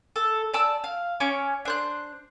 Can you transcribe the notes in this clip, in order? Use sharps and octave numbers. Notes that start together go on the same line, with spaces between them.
A4
D5 A5 E6
F5
C#4 C#5 D6
D4 C5 F#6